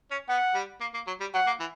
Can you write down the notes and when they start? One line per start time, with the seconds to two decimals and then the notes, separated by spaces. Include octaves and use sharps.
0.11 C#4
0.29 B3 F#5
0.55 G3
0.81 A#3
0.94 A#3
1.07 F#3
1.21 G3
1.34 F#3 F#5
1.47 A#3
1.60 E3